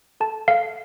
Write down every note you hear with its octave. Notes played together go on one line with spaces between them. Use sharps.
A4 A5
A4 F5